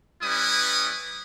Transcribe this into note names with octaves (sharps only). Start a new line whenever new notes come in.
G3 C#4 E4 B4 D#6